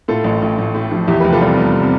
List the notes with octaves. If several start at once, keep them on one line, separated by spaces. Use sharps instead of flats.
A2 F4 A4
A1
A1
A1
A2
F3
E2 E4 G4
G4 B4
F1
F4 A4
G3 C4
F1 B3
C4